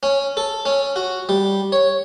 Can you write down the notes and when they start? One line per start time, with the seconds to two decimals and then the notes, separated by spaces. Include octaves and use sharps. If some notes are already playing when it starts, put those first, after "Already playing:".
0.03 C#4
0.37 A4
0.66 C#4
0.96 F#4
1.29 G3
1.72 C#5